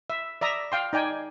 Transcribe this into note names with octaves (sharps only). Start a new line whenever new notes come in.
E5
D5 E5 A#5 D#6
F5 G5 C6
D#4 D5 G5 G#5